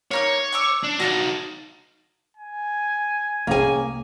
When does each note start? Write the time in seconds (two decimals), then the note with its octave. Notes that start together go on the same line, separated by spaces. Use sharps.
0.11 A#3 D#4 C#5 F6
0.53 C#6 D6 E6
0.83 D4
1.00 D#4 F#4 D#5 F5 A5
2.37 G#5
3.47 C2 A2 A#3 C#4 G#4 G#5